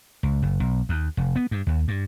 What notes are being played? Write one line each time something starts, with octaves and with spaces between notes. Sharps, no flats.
C#2
F#1
B1
D#2
F1
B3
G2
D#2
G2